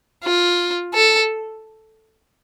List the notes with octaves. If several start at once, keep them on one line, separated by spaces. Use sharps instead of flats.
F4
A4